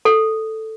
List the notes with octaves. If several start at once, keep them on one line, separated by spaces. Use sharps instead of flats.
A4